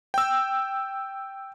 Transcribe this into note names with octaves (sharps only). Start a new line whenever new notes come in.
G5 E6